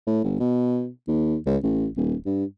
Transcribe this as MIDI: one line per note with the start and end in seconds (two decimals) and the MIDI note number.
0.07 0.20 45
0.24 0.39 31
0.40 0.88 47
1.08 1.37 39
1.46 1.57 37
1.63 1.88 33
1.96 2.14 27
2.26 2.44 43